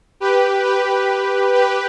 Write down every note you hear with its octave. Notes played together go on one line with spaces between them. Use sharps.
G4 B4
G4 B4
G4 B4